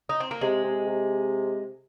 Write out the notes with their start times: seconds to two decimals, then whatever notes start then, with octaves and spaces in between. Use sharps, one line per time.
0.09 D#4
0.20 C4
0.31 A#3
0.41 C3 G#3
0.64 C3
0.86 C3